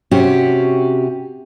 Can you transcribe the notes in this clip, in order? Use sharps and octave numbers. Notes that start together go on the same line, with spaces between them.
C3 C#4 F#4 G4